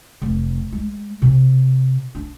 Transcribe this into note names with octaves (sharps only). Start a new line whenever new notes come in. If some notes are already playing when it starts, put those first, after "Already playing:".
F1
G#3
C3
D4